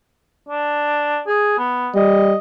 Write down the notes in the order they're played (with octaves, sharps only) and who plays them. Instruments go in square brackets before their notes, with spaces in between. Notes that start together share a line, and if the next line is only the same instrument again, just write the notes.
[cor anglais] D4
G#4
B3
[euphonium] G3 [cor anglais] D#5